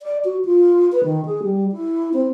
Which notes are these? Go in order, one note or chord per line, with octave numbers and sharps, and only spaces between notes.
D5
F#4
F4
B4
D#3
G#4
G3
E4
C4